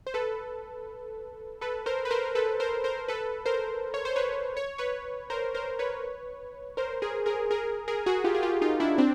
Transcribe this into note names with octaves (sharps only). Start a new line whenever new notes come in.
C5
A4 B4
A4 B4
A#4 C5
B4
A#4 C5
A#4
A4 B4
A#4 C5
A#4 C5
A4 B4
A#4 C5
C#5
C5
B4 C#5
C#5
B4 C#5
A#4 C5
A#4 C5
B4 C#5
A#4 C5
G#4 A#4
G#4 A#4
G#4 A#4
G#4 A#4
F#4 G#4
F4 G4
G#4
F4 G4
D#4 F4
D4 E4
C4 D4